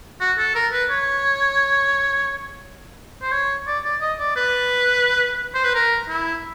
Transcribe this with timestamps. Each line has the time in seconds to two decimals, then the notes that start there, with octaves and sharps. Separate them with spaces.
0.20 F#4
0.38 A4
0.55 A#4
0.72 B4
0.90 C#5
3.22 C5
3.32 C#5
3.67 D5
3.84 D5
4.01 D#5
4.19 D5
4.36 B4
5.55 C5
5.65 B4
5.75 A#4
6.09 E4